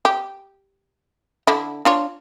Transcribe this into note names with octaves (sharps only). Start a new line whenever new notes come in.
G4
D3 E4
D4 F4 C#5